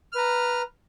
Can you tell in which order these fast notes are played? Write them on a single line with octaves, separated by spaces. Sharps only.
F6 B4 A#5